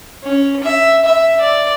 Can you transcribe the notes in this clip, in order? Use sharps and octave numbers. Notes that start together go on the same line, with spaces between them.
C#4
E5
E5
D5